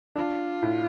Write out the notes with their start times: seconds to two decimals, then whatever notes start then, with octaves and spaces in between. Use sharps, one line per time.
0.16 D4 F4
0.62 A2